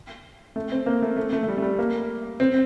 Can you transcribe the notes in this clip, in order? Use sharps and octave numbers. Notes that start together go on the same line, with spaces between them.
A3
C4
A#3
A3
A3
A3
A3
G3
A3
G3
A#3
C4